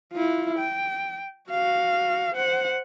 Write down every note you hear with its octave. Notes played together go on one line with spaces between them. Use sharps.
E4 F4
G5
F#4 F5
C5 F#5